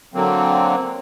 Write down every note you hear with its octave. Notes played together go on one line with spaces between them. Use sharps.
D3 F#3 A#3 C4